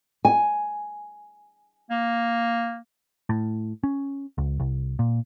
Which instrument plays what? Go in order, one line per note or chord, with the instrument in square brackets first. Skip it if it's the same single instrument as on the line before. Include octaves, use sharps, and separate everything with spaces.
[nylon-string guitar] G#5
[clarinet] A#3
[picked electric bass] A2
C#4
C#2
C2
A#2